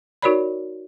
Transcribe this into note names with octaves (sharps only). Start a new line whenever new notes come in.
D#4 F#4 A#4 C#5 D5 B5